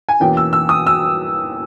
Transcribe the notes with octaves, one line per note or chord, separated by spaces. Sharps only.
G#5
E2 B2 A#3 C#4 G5
E6
E6
D#6
E6